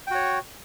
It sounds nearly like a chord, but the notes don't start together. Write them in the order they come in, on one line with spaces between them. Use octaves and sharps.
G5 F#4 C#5